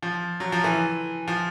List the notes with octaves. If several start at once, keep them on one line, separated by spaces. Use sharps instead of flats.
F3
F#3
F3
E3
F3